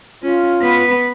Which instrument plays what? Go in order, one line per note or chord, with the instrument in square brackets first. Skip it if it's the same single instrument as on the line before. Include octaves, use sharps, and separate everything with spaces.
[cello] C#4 [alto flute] F4
[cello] B3 B4